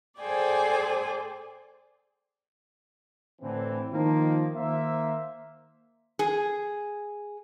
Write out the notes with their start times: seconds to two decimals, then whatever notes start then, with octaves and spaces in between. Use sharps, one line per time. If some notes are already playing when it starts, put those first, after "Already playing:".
0.19 G#4 A4 C5 D5 G5 G#5
3.42 A2 D3 E3 C4
3.92 D#3 F3 A#3
4.55 D#3 A#3 C5 E5
6.19 G#4